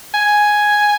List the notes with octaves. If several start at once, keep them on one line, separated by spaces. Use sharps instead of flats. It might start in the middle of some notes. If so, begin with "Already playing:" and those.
G#5